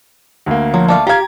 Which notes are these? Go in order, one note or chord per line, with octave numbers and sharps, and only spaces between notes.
D2 A#3
F3 F#3
A3 D5 F5
F4 G4 F5 A#5 G#6